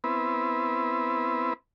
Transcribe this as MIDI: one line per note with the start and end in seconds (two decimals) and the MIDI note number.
0.04 1.53 59
0.04 1.53 60
0.04 1.53 64
0.04 1.53 71